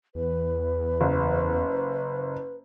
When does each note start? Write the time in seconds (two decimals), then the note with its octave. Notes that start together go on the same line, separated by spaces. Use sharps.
0.15 E2 B4
1.01 F#1